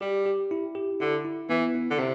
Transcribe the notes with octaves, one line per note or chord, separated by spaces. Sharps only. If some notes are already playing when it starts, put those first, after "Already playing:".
G3 G4
G4
E4
G4
D3 E4
E4
E3 B3
E4
D3
C3 C4